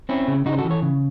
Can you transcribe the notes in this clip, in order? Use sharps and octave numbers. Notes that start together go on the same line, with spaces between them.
C4 C#4 E4
C#3
C#3 D#4 F#4
C5
F#4 A4
E3
A4 C#5
C#3